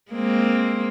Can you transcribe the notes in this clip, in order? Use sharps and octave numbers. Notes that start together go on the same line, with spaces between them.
G#3 A#3 C4